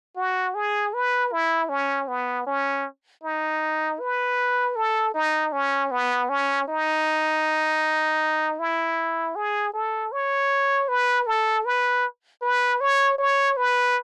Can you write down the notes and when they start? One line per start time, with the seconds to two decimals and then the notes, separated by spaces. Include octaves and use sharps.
0.16 F#4
0.55 G#4
0.94 B4
1.32 E4
1.69 C#4
2.08 B3
2.46 C#4
3.24 D#4
4.00 B4
4.76 A4
5.14 D#4
5.52 C#4
5.91 B3
6.29 C#4
6.68 D#4
8.59 E4
9.36 G#4
9.73 A4
10.12 C#5
10.88 B4
11.27 A4
11.65 B4
12.42 B4
12.80 C#5
13.18 C#5
13.57 B4